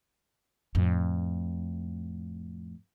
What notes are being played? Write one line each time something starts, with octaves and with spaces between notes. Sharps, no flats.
F2 A2